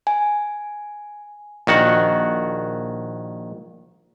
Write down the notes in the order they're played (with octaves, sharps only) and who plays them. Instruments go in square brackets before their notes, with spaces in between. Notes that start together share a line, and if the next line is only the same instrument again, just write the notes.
[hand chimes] G#5
[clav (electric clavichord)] A#1 D#3 F#4 F#5